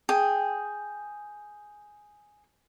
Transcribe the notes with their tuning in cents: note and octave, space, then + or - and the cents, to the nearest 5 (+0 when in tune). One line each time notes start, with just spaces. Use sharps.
G#4 +0 G5 +5